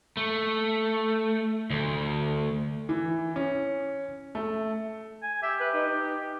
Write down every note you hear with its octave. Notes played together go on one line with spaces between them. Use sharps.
A3
D2
E3
C#4
A3
G#5
G4 E5
B4
D#4